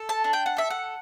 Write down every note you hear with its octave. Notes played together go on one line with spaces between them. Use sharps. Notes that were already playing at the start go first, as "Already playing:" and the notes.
Already playing: A4
A5
D4
G5
F#5
A4 E5
F#5